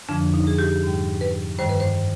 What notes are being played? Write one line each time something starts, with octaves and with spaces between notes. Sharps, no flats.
F2 D3 F3 D4
D#4
G#4
G4
G#2 G3
B4
G2 D#3 G3 C5
B4
C5